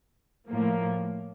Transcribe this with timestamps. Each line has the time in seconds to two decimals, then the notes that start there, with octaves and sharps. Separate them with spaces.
0.49 A2 F3 A#3